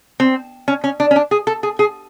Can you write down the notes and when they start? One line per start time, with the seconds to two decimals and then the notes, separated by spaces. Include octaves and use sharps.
0.20 C4
0.68 C#4
0.84 C#4
1.00 D4
1.11 C#4
1.16 D4
1.31 G#4
1.47 A4
1.63 G#4
1.79 G#4